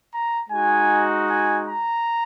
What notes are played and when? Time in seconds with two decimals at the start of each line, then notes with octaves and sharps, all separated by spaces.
0.12 A#5
0.50 G#3 D#4 F#4 G#5
1.28 G#5
1.67 A#5